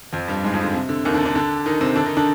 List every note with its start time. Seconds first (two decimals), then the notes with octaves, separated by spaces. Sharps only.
0.12 F2 F3
0.28 G2 G3
0.44 G#2 G#3
0.53 F2 F3
0.64 D3
0.74 C3
0.89 D3
1.05 D#2 D#3
1.14 D3 D4
1.25 D3 D4
1.35 D3 D4
1.66 D#3 D#4
1.81 C3 C4
1.96 D3 D4
2.06 D#3 D#4
2.17 D3 D4